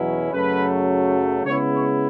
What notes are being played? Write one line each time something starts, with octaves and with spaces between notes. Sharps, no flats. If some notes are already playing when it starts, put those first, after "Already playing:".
Already playing: E2 B2 F#3 C#4 E4
F#2 C#3 F#3 A3 B4
C#3 G#3 B3 E4 C#5
C#5